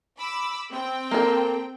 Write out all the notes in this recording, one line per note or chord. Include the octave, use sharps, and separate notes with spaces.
B5 D6 E6
C4 G5
A#3 A4